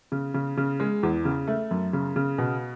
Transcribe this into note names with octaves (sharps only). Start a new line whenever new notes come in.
C#3
C#3
C#3
G#3
E2
C#3
A3
F#2
C#3
C#3
B2